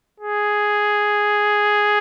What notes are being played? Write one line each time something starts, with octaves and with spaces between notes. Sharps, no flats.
G#4